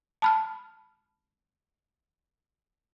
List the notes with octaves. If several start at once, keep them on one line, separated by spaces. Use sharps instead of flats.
A5 B5 F6